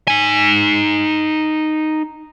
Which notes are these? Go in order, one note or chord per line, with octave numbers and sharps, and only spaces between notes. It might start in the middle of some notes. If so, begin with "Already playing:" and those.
D#4 G#5